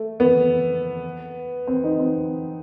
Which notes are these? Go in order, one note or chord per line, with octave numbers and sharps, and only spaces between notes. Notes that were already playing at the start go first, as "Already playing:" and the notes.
Already playing: A3
B3
C4
D#4
C4